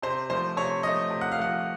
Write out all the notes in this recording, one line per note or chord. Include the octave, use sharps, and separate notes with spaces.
C3 C5
F3 A3 C5
C3 C#5
F3 A3 D#5
C3
F#5
F5
F3 A3 F#5